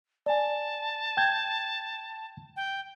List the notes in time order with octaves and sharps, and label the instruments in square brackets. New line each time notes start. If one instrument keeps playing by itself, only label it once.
[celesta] D5 G#5 [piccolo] A5
[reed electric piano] G5 G6 G#6
[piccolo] G5